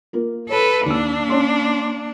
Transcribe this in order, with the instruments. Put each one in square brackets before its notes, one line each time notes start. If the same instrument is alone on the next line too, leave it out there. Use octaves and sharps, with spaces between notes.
[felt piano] A#3 F4 A#4
[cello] A4 B4 [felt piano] C#5
[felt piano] D#2 E6 [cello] A#3 D4
[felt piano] C#4 C#5 C6